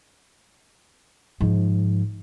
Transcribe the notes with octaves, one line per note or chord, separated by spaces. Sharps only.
G#2 F3